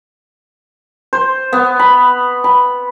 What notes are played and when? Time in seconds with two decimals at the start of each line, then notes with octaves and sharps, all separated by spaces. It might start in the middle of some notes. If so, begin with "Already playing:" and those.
1.13 C5
1.53 B3
1.79 B5
2.44 B5